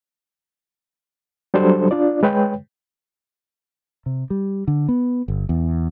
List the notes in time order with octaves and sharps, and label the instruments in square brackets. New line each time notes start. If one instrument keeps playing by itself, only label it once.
[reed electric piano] F#3 G3 D4 A4 C5
D4 F4 D5
G#3 B4 C#5 G5
[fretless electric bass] C3
G3
D3
B3
G1
E2